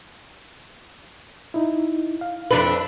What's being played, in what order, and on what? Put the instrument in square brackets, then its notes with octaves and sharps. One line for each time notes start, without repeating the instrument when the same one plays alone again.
[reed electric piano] D#4 E4
F5
[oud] F2 D4 B4